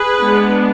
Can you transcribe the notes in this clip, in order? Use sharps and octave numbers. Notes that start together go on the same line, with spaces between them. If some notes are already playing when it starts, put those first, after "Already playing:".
Already playing: G#4 B4
G#3 B3 D4